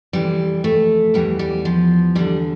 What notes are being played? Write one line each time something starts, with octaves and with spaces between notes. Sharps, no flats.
F2 C3 E3 G3
A3
E2 E3 G3
G3
F3
E2 D3 G3